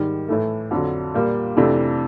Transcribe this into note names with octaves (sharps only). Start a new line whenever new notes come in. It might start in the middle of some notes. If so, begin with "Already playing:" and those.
Already playing: G#2 D#3 G3
A2 E3 A3
F2 D3 F#3
A#2 G3 A#3
F2 C3 E3 A3 D4